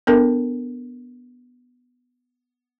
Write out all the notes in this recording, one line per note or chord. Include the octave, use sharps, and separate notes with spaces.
B3 D4 A4 A#4